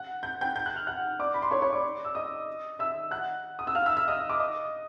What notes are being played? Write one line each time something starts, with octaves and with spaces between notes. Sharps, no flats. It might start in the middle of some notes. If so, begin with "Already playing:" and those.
Already playing: F#5 F#6
G6
G5 G6
G6
F#6
F6
F#5 F#6
D5 D6
B5
C6
C#5 C#6
C#5 C#6
D5 D6
E6
D#5 D#6
E5 E6
F#5 F#6
D#6
E6
F5 F6
E5 E6
E5 E6
D#5 D#6
D6
D#5 D#6